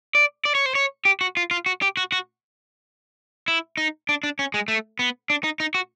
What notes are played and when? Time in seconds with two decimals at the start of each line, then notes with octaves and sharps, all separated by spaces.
0.15 D5
0.45 D5
0.55 C#5
0.66 C5
0.75 C#5
1.05 G4
1.21 F#4
1.37 F4
1.51 F4
1.66 F#4
1.82 G4
1.97 F#4
2.12 F#4
3.48 E4
3.77 D#4
4.09 D4
4.23 D4
4.39 C#4
4.54 G#3
4.68 A3
4.99 B3
5.30 D4
5.44 D#4
5.60 D#4
5.74 F#4